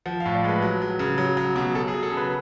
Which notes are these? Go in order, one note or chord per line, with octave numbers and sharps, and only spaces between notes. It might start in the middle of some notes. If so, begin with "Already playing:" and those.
F3 F#5
F5
A2
D5
G#3 B4
F#3
F#3
C#3
F#3
F#3
B2
F#3 A4
G#4
F#3
A4
C#3
B4